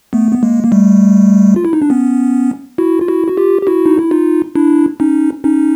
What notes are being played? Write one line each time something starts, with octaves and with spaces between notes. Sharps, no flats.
A3 B3
B3
G#3 A#3
A#3
G3 A3
F4
E4
D#4
D4
B3 C#4
E4 F#4
F4
E4 F#4
F#4
F4 G4
G4
E4 F#4
D#4
E4
D#4 F4
D4 E4
C#4 D#4
C#4 D#4